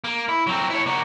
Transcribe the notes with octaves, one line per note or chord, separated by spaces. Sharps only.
A#3
E4
F#3 C4
E4 C#5
A#3 F#4